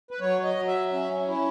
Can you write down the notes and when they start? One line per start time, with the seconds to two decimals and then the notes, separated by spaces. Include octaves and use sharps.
0.11 B4
0.20 F#3 C#5
0.44 D#5
0.56 F#3
0.68 E5
0.92 C#4 E5
1.28 E4